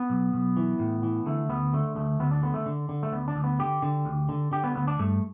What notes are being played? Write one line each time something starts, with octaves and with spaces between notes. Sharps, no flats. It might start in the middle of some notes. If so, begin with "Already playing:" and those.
Already playing: B3
B1
B1
E3
A2
E3
D3 A3
D2 B3
D3 A3
D2 A3
D2 B3
D4
D3 B3
A3
D3
D3
A3
D2 B3
D4
D2
B3
D3 G4
D3
D2
D3
D3 G4
B3
D2 B3
D4
G2 A3